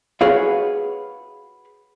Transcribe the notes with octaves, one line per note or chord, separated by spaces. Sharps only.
F#4 G#4 B4 C#5 F5